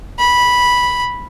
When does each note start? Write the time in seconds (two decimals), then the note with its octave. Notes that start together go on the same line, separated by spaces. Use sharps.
0.19 B5